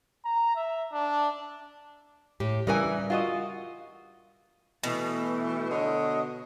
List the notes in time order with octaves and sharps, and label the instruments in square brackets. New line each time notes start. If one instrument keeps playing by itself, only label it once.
[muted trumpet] A#5
E5
D4
[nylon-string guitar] A2 G4
[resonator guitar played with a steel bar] C#3 E3 [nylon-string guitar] G3 A#4 G#5
[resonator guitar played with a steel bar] F4 F#4 D#5
[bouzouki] B2 [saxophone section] E3 A3
[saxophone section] D3 C#5 D#5